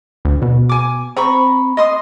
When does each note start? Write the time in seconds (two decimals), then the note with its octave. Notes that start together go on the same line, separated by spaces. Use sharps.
0.25 D2
0.42 B2
0.69 G#5 D6
1.17 C4 A#5 B5 C#6
1.77 D#5 C6 D#6